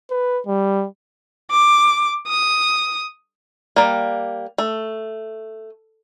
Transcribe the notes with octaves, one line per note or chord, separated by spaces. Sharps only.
B4
G3
D6
D#6
G3 A#3
A3